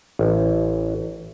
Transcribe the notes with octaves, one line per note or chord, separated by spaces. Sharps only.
A1